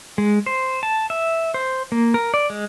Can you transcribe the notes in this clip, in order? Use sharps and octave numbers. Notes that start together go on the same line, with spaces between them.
G#3
C5
A5
E5
C5
A#3
A#4
D5
G#3